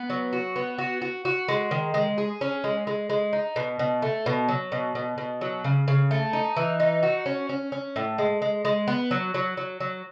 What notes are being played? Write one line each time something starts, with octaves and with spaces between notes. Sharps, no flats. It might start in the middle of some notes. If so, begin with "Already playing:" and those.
Already playing: B3
F#3
F#4
B3
F#4
F#4
F#4
G#3
D#3
G#3
G#4
C#4
G#3
G#3
G#3
D#4
B2
B2
A3
B2
F#3
B2
B2
B2
F#3
C#3
C#3
A3
D#4
E3
D#4
F#4
C#4
C#4
C#4
A2
G#3
G#3
G#3
B3
F#3
F#3
F#3
F#3